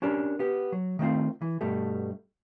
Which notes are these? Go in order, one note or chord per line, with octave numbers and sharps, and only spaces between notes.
C#4 D4 G4 A#4
B3 G4
F#3
D#3 A3 C4 F4
E3
G2 B2 G3 A3